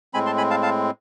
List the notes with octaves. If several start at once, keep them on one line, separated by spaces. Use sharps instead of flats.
A2 G#3 C4 G#5 B5
A5 C6
G#5 B5
F5 A5
F5 A5